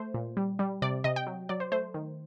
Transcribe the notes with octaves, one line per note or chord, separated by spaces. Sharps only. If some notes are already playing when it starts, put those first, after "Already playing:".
Already playing: A3 C5
A#2
G3
G3
C3 D5
C3 D#5
G5
F#3
F#3 D5
C5
A3 C5
D#3